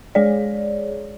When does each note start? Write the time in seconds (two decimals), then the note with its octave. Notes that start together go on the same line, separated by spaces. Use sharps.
0.15 G#3 G#4 C#5 D5